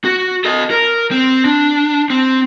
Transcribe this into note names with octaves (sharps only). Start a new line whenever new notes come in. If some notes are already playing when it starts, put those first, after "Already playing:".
F#4
A4 D#5
A#4
C4
D4
C4